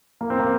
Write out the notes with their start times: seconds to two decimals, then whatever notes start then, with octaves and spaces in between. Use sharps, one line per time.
0.21 A#3
0.30 C4
0.39 A#3